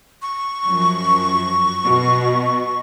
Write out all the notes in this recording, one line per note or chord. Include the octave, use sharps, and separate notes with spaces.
C#6
F#2 F3
B2